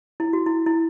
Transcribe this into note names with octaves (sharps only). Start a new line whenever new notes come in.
E4
F#4
E4
E4